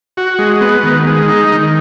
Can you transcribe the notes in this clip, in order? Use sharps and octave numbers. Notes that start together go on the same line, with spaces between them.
F#4
G#3
B3
D#3
G#3
D#4
D#3